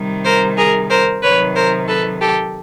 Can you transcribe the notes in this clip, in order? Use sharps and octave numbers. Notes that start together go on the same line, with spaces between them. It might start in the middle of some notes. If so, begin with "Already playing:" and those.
Already playing: C3 D#3 G3
A#4 C5
G#4 A#4
A#4 C5
C3 D#3 F#3 B4 C#5
A#4 C5
A4 B4
G4 A4